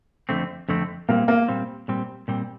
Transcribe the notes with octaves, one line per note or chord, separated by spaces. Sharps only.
F2 D3 A3 C4
F2 D3 A3 C4
A#2 G3 A#3 C4
A#3
A#2 G3 C4
A#2 G3 C4
A#2 G3 C4